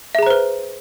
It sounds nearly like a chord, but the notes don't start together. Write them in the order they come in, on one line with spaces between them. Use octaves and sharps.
E5 G#4 A#5 C5 B4